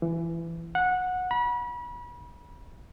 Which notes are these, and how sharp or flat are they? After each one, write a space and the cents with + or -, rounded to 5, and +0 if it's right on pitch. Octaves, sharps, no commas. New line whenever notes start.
E3 +20
F#5 -15
B5 -35